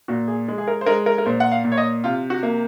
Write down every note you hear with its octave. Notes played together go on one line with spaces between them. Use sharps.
A#2 F#4
G#4
G#3
G#4
A#4
C5
G#3 A#4
A#4
A#4
A#2 C5
F#5
F5
A#2
C#5
D#5
C3 F4
F#4
A#3